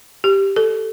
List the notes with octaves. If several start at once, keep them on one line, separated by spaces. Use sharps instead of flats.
G4
A4